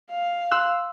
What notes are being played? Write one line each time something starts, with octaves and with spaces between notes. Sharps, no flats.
F5
C6 E6 F#6